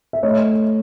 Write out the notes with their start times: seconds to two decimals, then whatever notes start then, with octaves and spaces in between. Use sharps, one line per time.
0.13 E5
0.23 A3 C#5 D#5